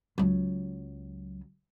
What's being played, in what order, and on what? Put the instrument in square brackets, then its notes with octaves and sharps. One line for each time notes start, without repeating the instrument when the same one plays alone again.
[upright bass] C#2 F#3